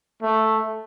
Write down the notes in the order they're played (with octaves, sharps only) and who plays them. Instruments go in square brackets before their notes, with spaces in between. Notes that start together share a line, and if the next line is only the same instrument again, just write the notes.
[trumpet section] A3